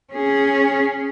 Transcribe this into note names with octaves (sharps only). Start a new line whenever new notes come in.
C#4 G#4